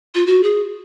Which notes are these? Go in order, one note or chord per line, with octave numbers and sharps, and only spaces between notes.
F4
F#4
G#4